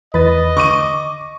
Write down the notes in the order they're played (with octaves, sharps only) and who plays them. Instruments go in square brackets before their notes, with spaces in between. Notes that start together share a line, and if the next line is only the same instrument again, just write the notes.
[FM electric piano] E2 E3 A6 [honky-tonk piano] B4 [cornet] D#5
[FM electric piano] D3 [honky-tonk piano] C#6 D6 D#7